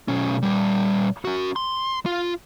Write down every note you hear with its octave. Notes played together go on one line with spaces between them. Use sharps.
B1 C#4
A#2 G3
C#4 F#4
C6
F4